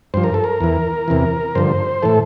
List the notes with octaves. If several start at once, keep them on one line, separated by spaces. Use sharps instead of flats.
G2 F3 C5
A#4
A4
A#4
E2 E3
E2 C3 E3
G2 D3 F3 C5
A2 E3 A4